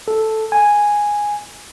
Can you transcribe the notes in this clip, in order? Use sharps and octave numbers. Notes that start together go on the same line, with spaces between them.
A4
G#5